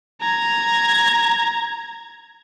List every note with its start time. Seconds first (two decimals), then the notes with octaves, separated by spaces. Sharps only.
0.22 A#5 G#6